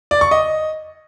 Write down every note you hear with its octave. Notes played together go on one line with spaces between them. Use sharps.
D5
C#6
D#5